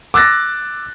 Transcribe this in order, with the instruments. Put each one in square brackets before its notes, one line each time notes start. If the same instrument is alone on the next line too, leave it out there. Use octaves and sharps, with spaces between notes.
[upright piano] D6 E6 F#6 A6 A#6